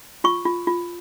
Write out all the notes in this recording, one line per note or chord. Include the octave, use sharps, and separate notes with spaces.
F4 C#6
F4
F4